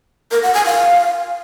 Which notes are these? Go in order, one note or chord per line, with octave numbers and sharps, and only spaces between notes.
A#4
F#5
G#5
F5